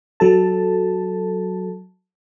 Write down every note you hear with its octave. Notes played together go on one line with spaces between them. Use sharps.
F#3 A4 A5